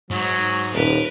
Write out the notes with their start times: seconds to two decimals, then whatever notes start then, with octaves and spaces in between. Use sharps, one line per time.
0.11 G#2 F#3
0.73 D#1 A#4 B4